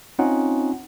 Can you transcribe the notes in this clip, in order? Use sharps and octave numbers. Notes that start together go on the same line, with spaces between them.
C4 C#4 D#4 F4 F#5